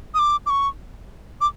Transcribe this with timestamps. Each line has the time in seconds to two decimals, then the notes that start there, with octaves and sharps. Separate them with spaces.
0.14 D#6
0.19 D6
0.46 D6
0.50 C#6
1.41 D6